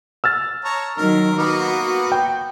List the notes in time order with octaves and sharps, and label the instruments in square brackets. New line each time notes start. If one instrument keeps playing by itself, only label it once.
[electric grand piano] E6 F6 A6
[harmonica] C#5 A5 A#5
[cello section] D#3 F#3 [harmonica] A#4
[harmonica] A#3 B3 B4 [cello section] F#4
[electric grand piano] G5